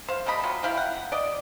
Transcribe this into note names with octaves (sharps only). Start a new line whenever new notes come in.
C5 F5
G3 A3 D#5 B5
F#3 F4
E4 F5 G5
F#5
D5 D#5